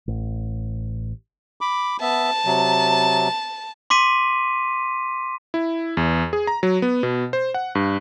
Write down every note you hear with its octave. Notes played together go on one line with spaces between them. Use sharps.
A1
B5 D6
B3 E5 A5
C3 F#3
C6 D6 B6 D#7
E4
E2
G#4
A#5
F#3
B3
B2
C5
F#5
G2